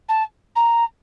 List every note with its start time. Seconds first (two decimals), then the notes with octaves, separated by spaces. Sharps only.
0.09 A5
0.56 A#5